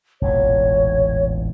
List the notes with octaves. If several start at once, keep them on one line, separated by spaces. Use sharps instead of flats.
E1 A1 A#2 C#5